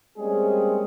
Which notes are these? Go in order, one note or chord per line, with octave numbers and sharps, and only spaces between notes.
G3 G#3 A#3 C4 C#4 G#4